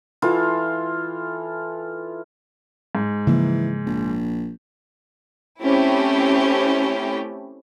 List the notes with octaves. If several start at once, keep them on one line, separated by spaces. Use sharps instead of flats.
E3 F4 A4
G#2
C#3 E3 F3 A#3
A#1
A3 C4 C#4 E4 G4